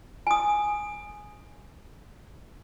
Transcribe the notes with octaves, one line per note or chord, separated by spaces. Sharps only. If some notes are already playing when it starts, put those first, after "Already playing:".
G#5 D#6